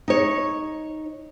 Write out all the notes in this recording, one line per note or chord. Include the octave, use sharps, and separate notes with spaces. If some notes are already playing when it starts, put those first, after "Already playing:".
D#4 C#5